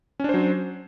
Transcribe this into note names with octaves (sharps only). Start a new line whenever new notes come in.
F#3 C#4 D4 C5